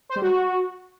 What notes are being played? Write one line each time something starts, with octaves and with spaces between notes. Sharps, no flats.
C5
G3
F#4